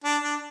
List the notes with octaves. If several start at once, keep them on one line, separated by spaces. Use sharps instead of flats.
D4
D4